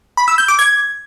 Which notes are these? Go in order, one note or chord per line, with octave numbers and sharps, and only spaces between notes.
B5
E6
G6
D6
G#6